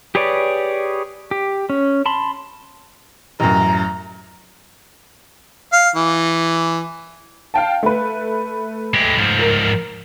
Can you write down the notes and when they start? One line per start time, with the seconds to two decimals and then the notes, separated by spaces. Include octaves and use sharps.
0.15 G4 G#4 B4 C#5 D5
1.31 G4
1.70 C#4
2.06 A5 B5 C6
3.40 A1 F#2 A#5
5.73 F5
5.95 E3
7.54 F5 G5 A5
7.83 A3 B4
8.94 G#3 G4
9.18 G#2 F3
9.39 A#4